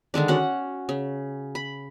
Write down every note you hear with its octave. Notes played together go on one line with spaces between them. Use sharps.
D3 D#3 G#3 D4
C#4 F#4 F#5
C#3
B5